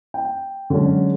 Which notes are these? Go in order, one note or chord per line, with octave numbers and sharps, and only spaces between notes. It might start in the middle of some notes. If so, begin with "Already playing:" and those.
G5
D3 F#3 G#3 C#4